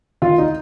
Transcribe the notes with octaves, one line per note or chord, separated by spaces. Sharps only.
D#3 F4 F5
D#4 D#5